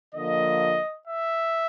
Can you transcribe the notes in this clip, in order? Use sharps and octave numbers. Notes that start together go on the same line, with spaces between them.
D3 F3 A#3 D#5
E5